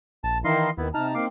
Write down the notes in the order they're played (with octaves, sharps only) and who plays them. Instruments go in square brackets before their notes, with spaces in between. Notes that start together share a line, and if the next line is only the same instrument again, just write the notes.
[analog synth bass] A#1 [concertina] A5
[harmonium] D#3 D#4 E4 [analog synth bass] E3 [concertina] D#5 F5 C6
[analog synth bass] D#2 [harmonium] D#3 [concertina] B3 E4
[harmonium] C3 A5 A#5 [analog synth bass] D#4 [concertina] F6
[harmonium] A#3 C4 [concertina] F5 D6